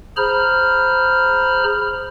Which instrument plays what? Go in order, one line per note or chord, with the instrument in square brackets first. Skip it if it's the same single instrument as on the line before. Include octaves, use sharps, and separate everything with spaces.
[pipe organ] G#4 C5 A#5 B5 F6